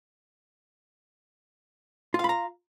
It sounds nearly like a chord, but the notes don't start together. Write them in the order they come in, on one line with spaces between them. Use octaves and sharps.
F4 F5 B5 A#5